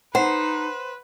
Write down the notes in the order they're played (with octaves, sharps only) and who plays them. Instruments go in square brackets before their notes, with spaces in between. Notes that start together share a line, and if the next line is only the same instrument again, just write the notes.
[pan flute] D#4 [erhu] B4 [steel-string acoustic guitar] C5 [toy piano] F#5